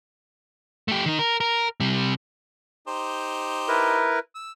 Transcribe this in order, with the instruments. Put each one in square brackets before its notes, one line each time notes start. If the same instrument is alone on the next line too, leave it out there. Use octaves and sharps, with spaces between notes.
[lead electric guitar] A3 G4
D#3 D#4
A#4
A#4
C3 G3
[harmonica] D#4 G4 C5
[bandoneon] E4 A#4 B4
[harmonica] E6